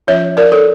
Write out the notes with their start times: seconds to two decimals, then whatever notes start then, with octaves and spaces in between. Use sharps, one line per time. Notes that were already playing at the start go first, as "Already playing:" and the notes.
0.07 F3 C#4 F4 C#5 E5
0.37 A#4 D5
0.52 A4 C#5